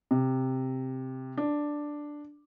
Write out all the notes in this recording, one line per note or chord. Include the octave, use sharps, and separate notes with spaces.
C3
D4